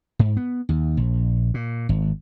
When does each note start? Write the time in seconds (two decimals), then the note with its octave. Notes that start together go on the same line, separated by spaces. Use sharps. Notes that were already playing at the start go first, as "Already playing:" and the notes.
0.19 G#2
0.37 B3
0.69 D#2
0.97 A#1
1.54 A#2
1.89 G#1